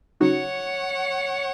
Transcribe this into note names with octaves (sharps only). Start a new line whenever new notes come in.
C#3 F#3 D#4 F#4 C#5 F#5